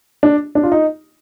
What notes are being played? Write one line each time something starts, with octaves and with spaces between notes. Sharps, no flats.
D4
D4
F4
D#4